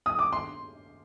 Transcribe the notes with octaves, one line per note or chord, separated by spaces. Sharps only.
D#6
D6
C6